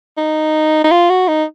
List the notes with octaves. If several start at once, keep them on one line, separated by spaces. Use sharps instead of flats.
D#4
D#4
F4
F#4
D#4